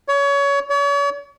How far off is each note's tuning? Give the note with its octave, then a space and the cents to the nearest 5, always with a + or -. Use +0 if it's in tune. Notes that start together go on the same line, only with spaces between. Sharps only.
C#5 +25
C#5 +40